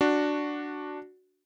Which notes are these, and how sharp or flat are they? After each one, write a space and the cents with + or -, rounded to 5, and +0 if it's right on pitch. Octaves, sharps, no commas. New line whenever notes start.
D4 +0 F#4 +0